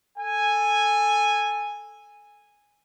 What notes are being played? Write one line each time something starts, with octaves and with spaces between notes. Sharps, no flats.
A4 G#5